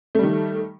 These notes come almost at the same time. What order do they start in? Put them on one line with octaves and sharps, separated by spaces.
A3 G3 D#3